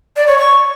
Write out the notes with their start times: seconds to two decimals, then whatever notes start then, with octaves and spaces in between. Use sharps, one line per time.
0.16 D5
0.27 C#5
0.38 C#6